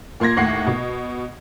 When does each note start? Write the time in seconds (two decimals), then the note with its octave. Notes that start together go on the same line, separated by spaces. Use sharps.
0.20 A#2 A#3 C6 G#6 A#6
0.37 D#2 A2 F#5 C7
0.67 B2